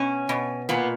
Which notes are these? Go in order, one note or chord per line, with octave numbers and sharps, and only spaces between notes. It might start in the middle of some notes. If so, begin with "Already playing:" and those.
Already playing: B2 C#4
B2
A#2 B3